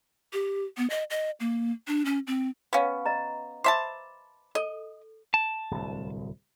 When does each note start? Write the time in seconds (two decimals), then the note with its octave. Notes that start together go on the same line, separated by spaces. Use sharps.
0.33 G4
0.77 B3
0.90 D#5
1.10 D#5
1.40 A#3
1.87 D4
2.05 C#4
2.27 C4
2.73 B3 C#4 B4 F5
3.06 D#5 A#5
3.64 C5 E5 A5 B5 D6
4.55 A4 D#5
5.34 A5
5.71 D1 C2